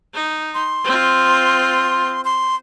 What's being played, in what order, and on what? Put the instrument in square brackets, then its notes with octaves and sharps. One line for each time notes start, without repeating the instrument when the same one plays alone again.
[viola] D#4
[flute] C6
[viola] C4 F4
[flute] C6